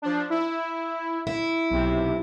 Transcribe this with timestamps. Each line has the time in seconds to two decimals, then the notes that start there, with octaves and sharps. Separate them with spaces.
0.02 F3 D4
0.30 E4
1.27 E4
1.70 B1 C3